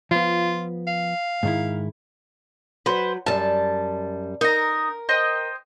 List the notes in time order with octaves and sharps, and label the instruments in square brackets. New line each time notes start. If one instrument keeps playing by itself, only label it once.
[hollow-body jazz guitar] F3 B3 [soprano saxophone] F4
[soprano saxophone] F5
[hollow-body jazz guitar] G#2 D#3 E4
[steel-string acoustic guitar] F#3 [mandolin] B4 C5
[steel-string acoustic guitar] F#2 G3 [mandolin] A5
[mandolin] D#4 A#5 [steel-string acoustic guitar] A#4
[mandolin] C5 D#5 G5